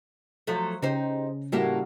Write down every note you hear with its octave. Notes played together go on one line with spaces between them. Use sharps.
F3 F#3 A3
C#3 D#4 G4 C5
A2 G3 A#3 E4 F#4